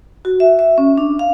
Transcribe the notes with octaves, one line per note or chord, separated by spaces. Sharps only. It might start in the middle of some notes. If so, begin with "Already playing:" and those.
F#4
E5
E5
C#4
D4
F5